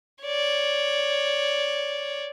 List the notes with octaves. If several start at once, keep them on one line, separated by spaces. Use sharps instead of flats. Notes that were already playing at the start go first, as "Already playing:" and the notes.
C#5 D5